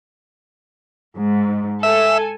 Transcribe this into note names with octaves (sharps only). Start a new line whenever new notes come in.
G#2
A4 E5 G#5